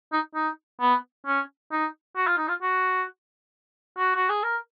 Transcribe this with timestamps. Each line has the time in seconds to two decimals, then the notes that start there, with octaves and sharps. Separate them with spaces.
0.12 D#4
0.35 D#4
0.81 B3
1.26 C#4
1.72 D#4
2.16 F#4
2.27 F4
2.37 D#4
2.48 F4
2.62 F#4
3.98 F#4
4.16 F#4
4.29 G#4
4.43 A#4